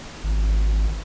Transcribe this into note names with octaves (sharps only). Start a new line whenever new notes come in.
G#1